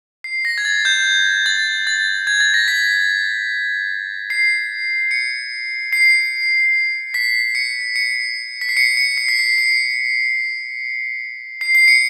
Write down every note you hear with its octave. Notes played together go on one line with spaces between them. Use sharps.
C7
A#6
G#6
A6
G6
A6
A6
G#6
A6
A#6
B6
C7
C#7
C7
B6
C#7
C#7
B6
C7
C#7
C#7
C7
B6
C7
C7
C7
C7
C#7